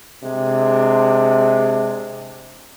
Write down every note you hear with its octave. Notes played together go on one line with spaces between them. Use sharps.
C3 G#3 D4